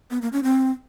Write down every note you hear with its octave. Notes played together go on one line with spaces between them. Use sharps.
B3
A#3
C#4
C4